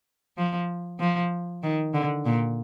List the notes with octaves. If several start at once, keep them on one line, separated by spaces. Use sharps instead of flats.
F3
F3
D#3
D3
A#2